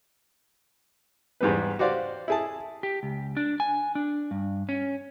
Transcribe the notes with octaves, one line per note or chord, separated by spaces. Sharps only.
E2 G#2 G3 B3 B4
F#4 G4 C5 D5 F5
E4 G#4 A5
G4
C#2
D4
G#5
D4
G2
C#4